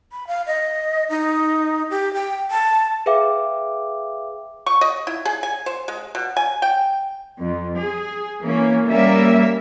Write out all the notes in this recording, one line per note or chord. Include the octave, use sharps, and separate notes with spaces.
B5
F5
D#5
D#4
G4
G5
A5
G#4 B4 E5 F5 G5 D6
C#6
D#5
E4
G#4
G#5
C5
G#3
B2
G#5
G5
F2
G#4
E3 A#3 C#4
G3 A#3 C#4 A#4 E5